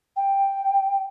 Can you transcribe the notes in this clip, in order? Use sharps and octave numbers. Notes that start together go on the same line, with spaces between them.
G5